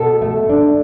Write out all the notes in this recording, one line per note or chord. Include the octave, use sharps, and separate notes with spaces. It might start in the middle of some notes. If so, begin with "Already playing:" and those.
Already playing: B2 A4
A3
D4